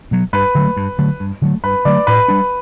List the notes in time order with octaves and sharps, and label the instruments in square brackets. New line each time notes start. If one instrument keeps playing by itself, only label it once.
[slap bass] B2 F#3
[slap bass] G2 [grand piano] B4
[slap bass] D3 F#3 A3
G2
D3 F#3 A3
G2
D3 F#3 A3
[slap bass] G2 [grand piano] B4
[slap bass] D3 F#3 A3 [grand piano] D5
[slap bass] A2 [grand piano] B4
[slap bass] G3 D4